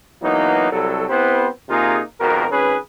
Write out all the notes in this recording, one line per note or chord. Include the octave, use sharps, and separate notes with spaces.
E3 F#3 A#3 B3 D#4
C2 F#3 A4
B3 C4 E4 G4 B4 C5
C3 A#3 D#4 F4 G#4
G#1 F2 B2 F#4 A#4
G#1 C#4 G#4 B4